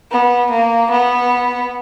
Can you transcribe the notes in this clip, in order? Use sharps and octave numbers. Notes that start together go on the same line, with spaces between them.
B3
A#3
B3